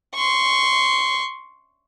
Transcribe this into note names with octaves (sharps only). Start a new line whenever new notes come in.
C6 C#6